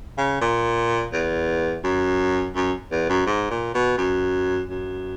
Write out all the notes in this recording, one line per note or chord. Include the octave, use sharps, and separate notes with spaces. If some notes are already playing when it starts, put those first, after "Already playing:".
C#3
A#2
E2
F#2
F#2
E2
F#2
G#2
A#2
B2
F#2
F#2